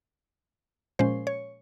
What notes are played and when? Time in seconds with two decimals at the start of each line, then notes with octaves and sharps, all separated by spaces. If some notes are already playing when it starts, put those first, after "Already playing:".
0.99 A#2 F3 G#3 C#4 C5
1.27 C#5